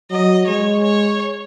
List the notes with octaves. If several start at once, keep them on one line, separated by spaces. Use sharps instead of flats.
F#3 D#5
G#3 C#5
C#5